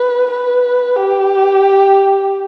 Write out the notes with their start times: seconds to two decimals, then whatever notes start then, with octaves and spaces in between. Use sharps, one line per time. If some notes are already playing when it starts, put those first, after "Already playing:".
Already playing: B4
0.31 B4
0.96 G4